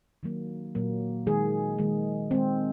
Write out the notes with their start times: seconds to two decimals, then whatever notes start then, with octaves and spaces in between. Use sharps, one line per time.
0.23 D#3 F#3 A#3
0.75 A#2 F#3 A#3
1.27 D#3 G#3 G#4
1.78 D#3 G#3
2.31 D#3 G#3 C4